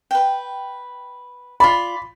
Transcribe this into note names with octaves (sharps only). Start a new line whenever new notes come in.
B4 G5
F4 D5 B5